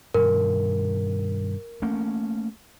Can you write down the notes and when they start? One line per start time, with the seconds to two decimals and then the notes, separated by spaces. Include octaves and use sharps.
0.14 G2 B2 D#3 A#4
1.82 A3 A#3 C#4